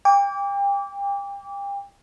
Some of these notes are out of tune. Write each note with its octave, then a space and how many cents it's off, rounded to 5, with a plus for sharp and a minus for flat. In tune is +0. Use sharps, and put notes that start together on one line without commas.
G5 +35 D6 -25